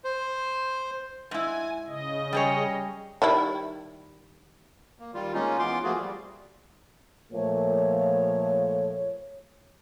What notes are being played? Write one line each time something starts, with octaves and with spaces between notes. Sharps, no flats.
C5
G#2 E4 G#5
C#3 D#5
G3 G#4 C#5
D#3 G3 E4
A#3
D#3 G3 F4
G#3 A#3 C#4 D#4 F4
E3 B3 F4 C6 D6
F3 A3 A#3 F4 F#4 G#4
G3
A#2 F3 A3 C#5